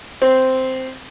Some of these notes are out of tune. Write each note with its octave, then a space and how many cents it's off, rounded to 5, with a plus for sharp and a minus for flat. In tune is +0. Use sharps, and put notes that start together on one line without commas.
C4 -5